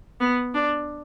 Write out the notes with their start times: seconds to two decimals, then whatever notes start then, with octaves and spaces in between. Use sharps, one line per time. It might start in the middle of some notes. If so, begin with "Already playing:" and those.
0.20 B3
0.55 D4